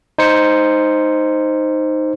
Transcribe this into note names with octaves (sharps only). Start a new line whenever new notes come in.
D#4 C5 C#7